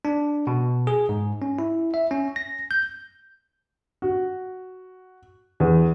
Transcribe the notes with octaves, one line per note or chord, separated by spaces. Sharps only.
D4
B2
G#4
G#2
C#4
E4
E5
C#4
A#6
G6
F#4
E2